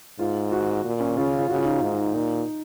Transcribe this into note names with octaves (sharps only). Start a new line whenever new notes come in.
G#2 F4
F#4
A#2
C#4
C#3 F4
F4
C#3 F#4
F4
D#4
F4
G#2
A#2 D#4